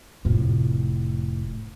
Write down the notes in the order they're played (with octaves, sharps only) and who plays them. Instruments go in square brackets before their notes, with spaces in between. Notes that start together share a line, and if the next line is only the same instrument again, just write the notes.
[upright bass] F1 A2